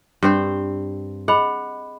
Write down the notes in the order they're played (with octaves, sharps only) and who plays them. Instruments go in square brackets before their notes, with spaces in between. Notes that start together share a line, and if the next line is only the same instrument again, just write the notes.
[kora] G2 C4 C5
[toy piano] G#4 D#5 B5 [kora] F#5